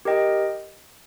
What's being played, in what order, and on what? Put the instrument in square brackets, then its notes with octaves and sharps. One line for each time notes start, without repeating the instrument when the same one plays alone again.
[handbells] G4 A#4 D#5 G5